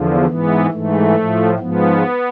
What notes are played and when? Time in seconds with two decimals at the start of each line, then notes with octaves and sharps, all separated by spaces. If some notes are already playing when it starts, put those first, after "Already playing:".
Already playing: E2 D3 F3
0.26 G#2 E3 B3
0.70 G#2 E3 A3
1.15 A2 F3
1.59 G#2 F3 B3